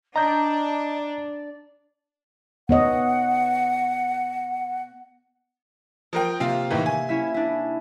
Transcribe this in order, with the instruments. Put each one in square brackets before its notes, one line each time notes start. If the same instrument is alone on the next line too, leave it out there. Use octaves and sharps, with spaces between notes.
[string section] D4 [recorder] D5 [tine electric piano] D#5 [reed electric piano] A#5 G6
[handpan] B3 C#5 D#5 [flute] F#5
[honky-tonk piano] F3 A#4 G5 [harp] D#6
[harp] C3 A#3 [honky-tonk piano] C4 F4 F5
[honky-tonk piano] A2 D#3 E3 [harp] E5
[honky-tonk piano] G#5
[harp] C#4 E4 E5
D4 E4